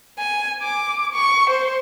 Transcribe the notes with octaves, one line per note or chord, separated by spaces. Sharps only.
G#5
D6
C#6
C5